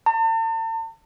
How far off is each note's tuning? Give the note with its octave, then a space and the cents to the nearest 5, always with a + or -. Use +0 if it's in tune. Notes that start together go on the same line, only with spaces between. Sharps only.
A5 +40